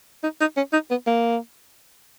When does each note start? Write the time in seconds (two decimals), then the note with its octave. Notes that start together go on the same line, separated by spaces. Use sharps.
0.23 D#4
0.40 D#4
0.57 C#4
0.73 D#4
0.90 B3
1.07 A#3